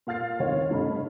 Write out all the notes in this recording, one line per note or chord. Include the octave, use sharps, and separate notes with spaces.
A#2 F5 F6 A6 C7
F#1 D#2 C4 C#5
F1 G2 A3 C#4 D#5 B5